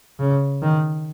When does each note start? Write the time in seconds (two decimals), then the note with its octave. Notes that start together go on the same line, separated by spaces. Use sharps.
0.20 C#3
0.62 D#3